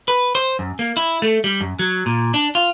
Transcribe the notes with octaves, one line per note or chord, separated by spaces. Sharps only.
B4
C5
F#2
A#3
E4
A3
G3
F#2
F#3
A#2
D4
F4